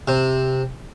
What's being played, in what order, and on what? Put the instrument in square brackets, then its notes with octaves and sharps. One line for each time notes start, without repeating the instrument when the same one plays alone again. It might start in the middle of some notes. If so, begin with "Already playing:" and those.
[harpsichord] C3